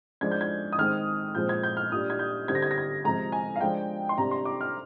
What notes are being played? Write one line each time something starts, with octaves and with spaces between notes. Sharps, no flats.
F3 G#3 D4 G#6
G6
G#6
D#6
D#3 G#3 C4 F6
A#2 F3 G#3 C4 G6
G#6
G6
F6
A#2 G3 D4 D#6
G#6
G6
D3 G3 C4 G#6
A#6
G#6
A#6
G#6
C3 F3 G#3 A#5
G#5
F5
F3 G#3 D4 G5
C6
C3 G3 D4 A#5
C6
D6
F6